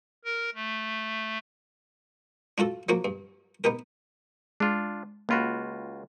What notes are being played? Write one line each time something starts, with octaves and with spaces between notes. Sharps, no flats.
A#4
A3
D4 F4 F#4 A4
F3 F#3 A#3 F#4
G2
B3 D#4 G4 A#4
G#3 D4 F4
C#2 A#3 F4 F#4 B5